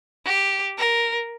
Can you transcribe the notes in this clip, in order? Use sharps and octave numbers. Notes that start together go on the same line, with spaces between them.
G4
A#4